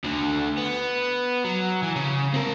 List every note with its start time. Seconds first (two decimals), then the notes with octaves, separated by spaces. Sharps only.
0.04 D2 D3
0.58 B3
1.44 F#3
1.83 E3
1.96 C#3
2.34 C4 A#4